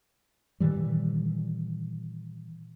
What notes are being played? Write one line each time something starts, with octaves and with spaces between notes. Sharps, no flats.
A#2 D#3 E3 G3